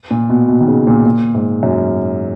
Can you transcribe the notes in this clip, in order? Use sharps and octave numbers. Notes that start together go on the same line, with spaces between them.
A#2
B2
B2
D#3
C#3
A#2
A#2
G#2
F#2